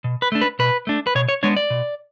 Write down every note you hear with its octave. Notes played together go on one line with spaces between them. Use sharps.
B2
B4
A3 D4
B4
B2 B4
A3 D4
B4
B2 C#5
C#5
G#3 B3 D4 C#5
D5
B2